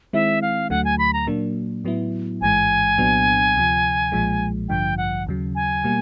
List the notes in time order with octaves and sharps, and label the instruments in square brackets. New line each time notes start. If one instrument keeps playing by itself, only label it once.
[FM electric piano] D#3 G#3 C4 E4 [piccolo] E5
[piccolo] F5
[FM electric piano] D2 D3 F#3 A3 [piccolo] F#5
[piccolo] G#5
B5
A#5
[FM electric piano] A#2 F#3 A#3 D4
A2 F#3 B3 E4
[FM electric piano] A1 G#2 E3 G#3 [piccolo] G#5
[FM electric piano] C2 A#2 F#3 B3 D4
D2 C3 F3
B1 A#2 F3 G#3
[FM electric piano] A1 G2 D3 F3 [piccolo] G5
[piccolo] F#5
[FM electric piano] D#2 C#3 F#3
[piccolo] G#5
[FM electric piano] B2 G3 A#3